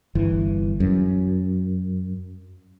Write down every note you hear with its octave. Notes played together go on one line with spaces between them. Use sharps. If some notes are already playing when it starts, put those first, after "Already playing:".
G1 E3
F#2